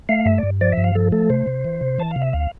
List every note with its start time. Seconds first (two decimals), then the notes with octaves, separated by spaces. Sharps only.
0.09 A3 F5
0.26 G2 E5
0.38 D5
0.43 G2
0.61 F3 D5
0.72 E5
0.77 G2
0.84 F5
0.95 F3 A4
1.12 A3 A4
1.30 C3 C5
1.47 C3
1.65 E3
1.81 C3
1.98 E3 A5
2.11 F5
2.16 C3
2.22 E5
2.33 D2 F5